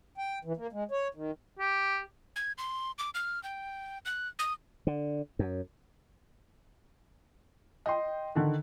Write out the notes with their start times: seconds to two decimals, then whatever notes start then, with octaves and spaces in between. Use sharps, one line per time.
0.18 G5
0.45 E3
0.57 A#3
0.72 G#3
0.91 C#5
1.14 D#3
1.59 G4
2.36 G#6
2.58 C6
2.99 D6
3.15 F6
3.43 G5
4.05 F#6
4.39 D#6
4.87 D3
5.39 F#2
7.86 D#5 G5 C6
8.35 D3 D#3